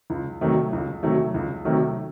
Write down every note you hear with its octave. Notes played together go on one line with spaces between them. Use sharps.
C#2
C3 D#3 F#3 A3
C#2
C3 D#3 F#3 A3
C#2
C3 D#3 F#3 A3